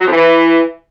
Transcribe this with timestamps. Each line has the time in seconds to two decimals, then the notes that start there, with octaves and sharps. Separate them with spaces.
0.01 F#3
0.07 F2
0.12 E3